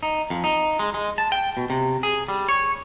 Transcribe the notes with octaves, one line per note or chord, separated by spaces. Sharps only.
D#4
F2
D#4
G#3
G#3
A5
G5
B2
C3
G#4
G3
C#5